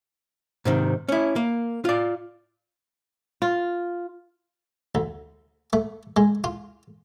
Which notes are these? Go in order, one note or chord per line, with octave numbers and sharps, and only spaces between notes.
G#2 C3 D#3
C#4 E4
A#3
F4 D5
F4
D2
A3
G#3
F4